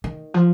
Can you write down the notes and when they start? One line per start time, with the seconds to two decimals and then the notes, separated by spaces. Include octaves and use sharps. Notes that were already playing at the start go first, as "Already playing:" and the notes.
0.04 D#3
0.34 F3